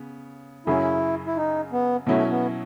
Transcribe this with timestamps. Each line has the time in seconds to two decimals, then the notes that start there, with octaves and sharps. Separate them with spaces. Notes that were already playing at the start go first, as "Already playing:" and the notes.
Already playing: C#3 B3
0.66 F#2 C#3 F#3 C#4 E4 G#4
1.27 E4
1.37 D#4
1.72 B3
2.07 B2 F#3 A3 C#4 E4
2.31 B3